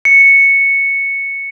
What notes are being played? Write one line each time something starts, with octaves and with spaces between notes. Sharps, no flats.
C#7